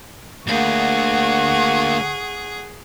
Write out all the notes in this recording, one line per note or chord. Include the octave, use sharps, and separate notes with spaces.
D2 A#3 G#4 F#5 C#6